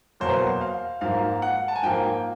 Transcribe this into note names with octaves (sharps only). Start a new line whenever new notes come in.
E2 B2 F#3 A#3 C5
F5
G#2 F3 A#3 F5
F#5
A5
G#5
G#2 F3 A#3 G5